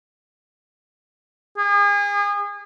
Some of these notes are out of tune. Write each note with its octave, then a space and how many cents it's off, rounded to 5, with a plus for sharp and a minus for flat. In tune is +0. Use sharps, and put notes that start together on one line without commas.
G#4 -35